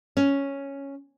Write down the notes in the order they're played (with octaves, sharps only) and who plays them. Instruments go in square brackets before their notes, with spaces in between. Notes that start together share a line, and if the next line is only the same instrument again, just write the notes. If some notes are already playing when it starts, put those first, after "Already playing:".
[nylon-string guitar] C#4